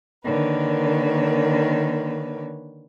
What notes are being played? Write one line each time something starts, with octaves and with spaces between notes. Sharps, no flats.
D3 D#3 A#3 B4 C#5